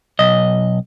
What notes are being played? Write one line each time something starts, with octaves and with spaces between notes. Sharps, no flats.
B1 D#5